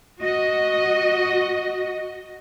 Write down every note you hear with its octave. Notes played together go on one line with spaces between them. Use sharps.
F#4 D#5